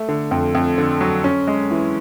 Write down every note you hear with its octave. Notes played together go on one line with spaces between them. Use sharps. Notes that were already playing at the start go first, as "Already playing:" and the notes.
Already playing: A3
D3
F2
F2
D3
F#3
C#4
G#3
E3